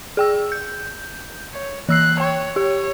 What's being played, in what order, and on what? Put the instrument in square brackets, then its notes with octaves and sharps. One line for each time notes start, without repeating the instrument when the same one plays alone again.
[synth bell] G#4 G5 E6
G6
[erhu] C#5
[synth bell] E3 E6 C7 [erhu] F#6
[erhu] C#5 [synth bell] G5
[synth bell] G4 [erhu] C#5